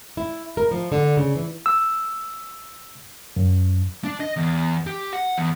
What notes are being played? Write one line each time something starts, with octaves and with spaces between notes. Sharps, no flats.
E4
A#4
F3
D3
C#3
E3
E6
F#2
D4
D#5
E2
G4
F#5
E2